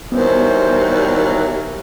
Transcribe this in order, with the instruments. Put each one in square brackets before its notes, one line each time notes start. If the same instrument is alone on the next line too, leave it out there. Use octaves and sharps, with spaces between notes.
[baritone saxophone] D#2 [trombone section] E3 F#3 G3 [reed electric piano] B3 [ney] C5